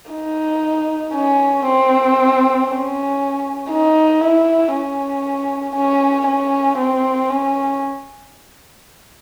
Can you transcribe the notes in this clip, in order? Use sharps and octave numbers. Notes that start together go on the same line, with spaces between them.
D#4
C#4
C4
C#4
D#4
E4
C#4
C#4
C#4
C4
C#4